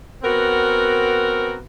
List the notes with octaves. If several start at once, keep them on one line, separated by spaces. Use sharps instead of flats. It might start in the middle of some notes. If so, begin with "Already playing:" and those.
B3 C4 F#4 A#4